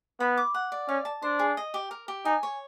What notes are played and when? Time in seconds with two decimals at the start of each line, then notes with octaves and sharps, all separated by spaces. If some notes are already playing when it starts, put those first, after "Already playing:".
0.20 B3 B5
0.37 D6
0.54 F#5
0.72 D5
0.88 C#4 F5
1.05 A5
1.22 D4 C5
1.39 G#4
1.57 D#5
1.74 G4
1.91 A#4
2.08 G4
2.25 D#4 G#5
2.43 C#5